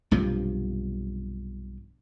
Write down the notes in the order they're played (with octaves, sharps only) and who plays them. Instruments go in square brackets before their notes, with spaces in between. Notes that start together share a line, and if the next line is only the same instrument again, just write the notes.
[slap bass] B1 G2 C3 F3